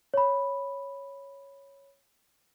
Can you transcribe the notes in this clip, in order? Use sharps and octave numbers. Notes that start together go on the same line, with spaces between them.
C#5 B5